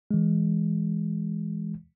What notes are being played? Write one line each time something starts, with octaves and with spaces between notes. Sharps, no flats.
E3 G#3